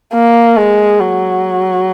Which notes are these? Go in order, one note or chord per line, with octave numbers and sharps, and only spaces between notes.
A#3
G#3
F#3